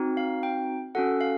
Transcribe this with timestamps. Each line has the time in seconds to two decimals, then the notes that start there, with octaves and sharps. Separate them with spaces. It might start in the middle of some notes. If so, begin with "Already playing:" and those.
Already playing: C4 D#4 F#4
0.17 F5
0.43 G5
0.95 C#4 F#4 A4 F#5
1.21 F5